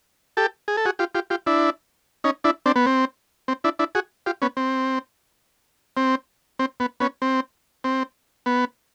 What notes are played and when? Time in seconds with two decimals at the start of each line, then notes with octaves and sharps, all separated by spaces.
0.37 G4 A4
0.68 G#4
0.77 A4
0.86 F#4 G#4
0.99 F4 G4
1.15 F4 G4
1.30 F4 G4
1.46 D4 E4
2.24 C#4 D#4
2.44 D4 E4
2.66 C4 D4
2.76 B3
2.86 C4
3.48 C4
3.64 D4 E4
3.79 D4 E4
3.95 F#4 G#4
4.26 F4 G4
4.42 B3 C#4
4.57 C4
5.97 C4
6.59 C4
6.80 B3
7.00 B3 C#4
7.22 C4
7.84 C4
8.46 B3